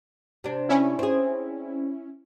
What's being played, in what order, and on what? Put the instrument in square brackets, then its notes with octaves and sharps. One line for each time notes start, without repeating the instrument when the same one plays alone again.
[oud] C3 D4
[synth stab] C#4 E4
[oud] C4 G#4